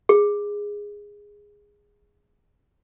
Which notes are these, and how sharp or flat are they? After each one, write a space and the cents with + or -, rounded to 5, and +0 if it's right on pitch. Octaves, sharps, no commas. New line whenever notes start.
G#4 -10